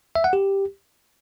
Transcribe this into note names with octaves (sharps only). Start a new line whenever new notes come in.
E5
F#5
G4